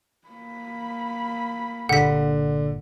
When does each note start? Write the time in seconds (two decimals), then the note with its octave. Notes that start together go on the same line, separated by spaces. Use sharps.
0.28 A#3 B5
1.89 G1 A#2 D3 F#5 B6